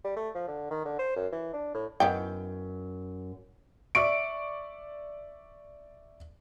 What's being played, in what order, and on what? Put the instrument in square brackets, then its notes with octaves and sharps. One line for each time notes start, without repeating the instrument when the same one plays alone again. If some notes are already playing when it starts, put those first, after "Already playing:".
[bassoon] G3
A3
F3
D3
D#3
D3
C5
F#2
E3
D4
A2
[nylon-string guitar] F#2 [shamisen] D#3 B3 G5
[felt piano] D5 E5 C#6 D7